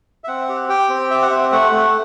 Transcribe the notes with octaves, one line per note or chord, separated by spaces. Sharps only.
E5
C4 F#5
G4
G4 G5
C4
G4 E5
F#5
C4 E5
A3 F#5
A3